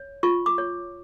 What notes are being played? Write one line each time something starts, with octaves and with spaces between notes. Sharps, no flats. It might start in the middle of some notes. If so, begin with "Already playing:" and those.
Already playing: C#5
F4 C#6
D6
C#5